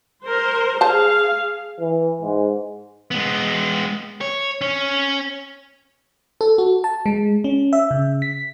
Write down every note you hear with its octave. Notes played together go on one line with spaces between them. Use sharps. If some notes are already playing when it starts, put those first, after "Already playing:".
A#4 C5
G#4 C5 F5 A5
E3
G#2
G#3 B3
C#5
C#4 C#5
A4
F#4
A5
G#3
C#4
E5
C#3
B6